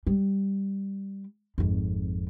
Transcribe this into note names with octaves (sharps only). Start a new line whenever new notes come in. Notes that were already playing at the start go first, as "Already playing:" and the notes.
G3
G#1 F2